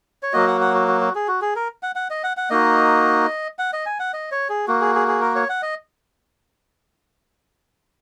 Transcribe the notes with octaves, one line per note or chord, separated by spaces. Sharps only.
C#5
F#3 A#3 F#4 D#5
F#5
F#5
F#4
F#4
F#4
G#4
F#4
G#4
A#4
F#5
F#5
D#5
F#5
F#5
A#3 D#4 F#4 D#5
F#5
D#5
G#5
F#5
D#5
C#5
G#4
A#3 F#4
G#4
G#4
G#4
A#4
C#5
F#5
D#5